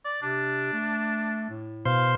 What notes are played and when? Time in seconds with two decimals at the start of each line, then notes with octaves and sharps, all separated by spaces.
0.05 D5
0.22 C3 D4
0.73 A3
1.50 A2
1.85 B2 C5 F5 C6